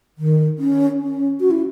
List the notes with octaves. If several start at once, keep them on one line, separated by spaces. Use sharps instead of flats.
D#3
C#4
C#4
F#4
E4